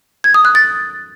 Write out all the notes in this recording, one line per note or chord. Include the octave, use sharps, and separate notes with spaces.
G#6
D#6
F#6
A6